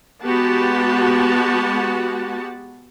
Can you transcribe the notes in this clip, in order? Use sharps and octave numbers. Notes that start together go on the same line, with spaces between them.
G#3 B3 F#4 G4 F#5 A5